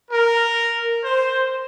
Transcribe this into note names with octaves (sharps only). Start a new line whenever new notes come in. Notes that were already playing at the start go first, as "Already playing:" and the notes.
A#4
C5